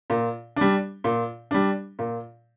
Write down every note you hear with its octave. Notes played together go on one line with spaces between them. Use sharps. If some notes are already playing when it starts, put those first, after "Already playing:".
A#2
G3 D4
A#2
G3 D4
A#2